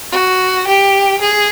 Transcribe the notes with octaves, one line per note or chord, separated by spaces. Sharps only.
F#4
G4
G#4